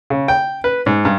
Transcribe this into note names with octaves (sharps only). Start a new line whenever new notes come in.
C#3
G5
B4
G#2
G2